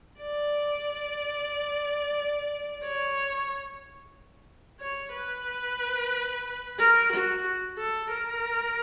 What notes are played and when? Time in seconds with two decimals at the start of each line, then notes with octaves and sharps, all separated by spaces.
0.20 D5
2.83 C#5
4.81 C#5
5.14 B4
6.79 A#4
7.12 F#4
7.78 A4
8.11 A#4